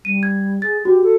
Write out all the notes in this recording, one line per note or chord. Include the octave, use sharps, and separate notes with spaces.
G3 D#7
G#6
G#4 A6
F#4 G4
A4